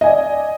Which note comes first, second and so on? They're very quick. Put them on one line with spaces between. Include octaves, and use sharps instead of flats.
D#5 G#5 D5